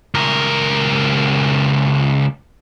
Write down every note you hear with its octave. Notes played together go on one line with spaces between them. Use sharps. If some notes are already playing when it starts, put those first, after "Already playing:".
C#2 A#4